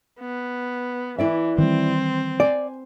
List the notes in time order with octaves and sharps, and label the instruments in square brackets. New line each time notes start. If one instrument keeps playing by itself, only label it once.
[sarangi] B3
[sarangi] E3 [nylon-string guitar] E4 D5 E5
[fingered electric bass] D#3 E3 G3 [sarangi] C4
[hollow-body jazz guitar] D5 [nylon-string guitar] G#5